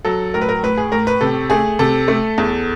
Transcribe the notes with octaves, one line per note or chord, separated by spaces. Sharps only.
F#3 A4
A2 A#4
B4
A#4
A2 B4
G#4
A2 A#4
B4
C3 A4
A3 G#4
C3 A4
A3
E2